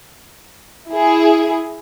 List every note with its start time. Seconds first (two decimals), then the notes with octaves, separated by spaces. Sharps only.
0.91 E4 G#4